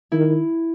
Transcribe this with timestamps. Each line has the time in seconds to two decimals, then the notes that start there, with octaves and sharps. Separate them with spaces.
0.12 D#3 E4